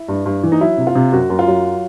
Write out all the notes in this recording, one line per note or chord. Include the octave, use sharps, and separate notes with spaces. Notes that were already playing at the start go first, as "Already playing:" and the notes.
Already playing: E4
G2
G2
E3
D#4
F#3 E4
C3
F4
C3
F#2 F#4
F#2
F4
F#3